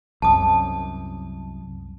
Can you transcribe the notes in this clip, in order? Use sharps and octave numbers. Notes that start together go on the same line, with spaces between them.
C2 F#2 A5 D#6